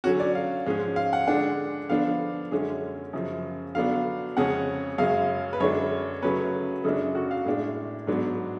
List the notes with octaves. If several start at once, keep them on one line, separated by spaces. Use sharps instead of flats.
D3 F#3 C#4 F#4
D5
F5
G#2 F3 G#3 C#4
F5
F#5
D3 G#3 D4 F#5
D3 F3 B3 D4 F5
F#2 D3 G#3 C#4
F#2 C#3 F3
D3 F#3 B3 D4 F5
F2 C#3 G#3 C#4 F#5
F#2 C#3 G#3 C#4 F5
B4
F#2 D3 G#3 D4 C#5
C#3 F#3 A3 C#4 B4
F#2 C#3 G#3 D4 A4
F#4
F5
A2 G#3 D4
G#2 F#3 B3 D4